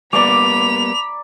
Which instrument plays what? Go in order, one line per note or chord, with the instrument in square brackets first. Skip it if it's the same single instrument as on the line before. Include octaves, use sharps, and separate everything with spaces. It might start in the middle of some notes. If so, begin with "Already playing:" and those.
[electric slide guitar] G3 A#3 B3 [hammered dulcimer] D5 A#5 D6 [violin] B5 F7